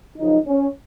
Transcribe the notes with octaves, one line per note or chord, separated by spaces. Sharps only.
F#2 C#3 F3 D#4
C#4